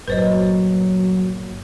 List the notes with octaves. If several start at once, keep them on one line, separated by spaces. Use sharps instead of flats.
G1 A#2 F#3 B4 C5 D#5